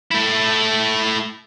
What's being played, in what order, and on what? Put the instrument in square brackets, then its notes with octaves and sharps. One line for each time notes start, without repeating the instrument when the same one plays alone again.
[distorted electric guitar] A3 E4